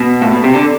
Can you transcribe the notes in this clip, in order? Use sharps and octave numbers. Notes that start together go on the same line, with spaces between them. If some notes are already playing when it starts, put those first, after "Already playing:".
Already playing: B2
A2
B2
C3
D3